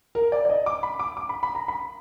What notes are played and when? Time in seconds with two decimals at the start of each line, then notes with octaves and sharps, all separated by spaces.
0.15 A#4
0.32 D5
0.45 D5
0.49 D#5
0.66 D6
0.83 B5
1.00 D6
1.17 D6
1.29 B5
1.43 B5
1.55 A#5
1.68 B5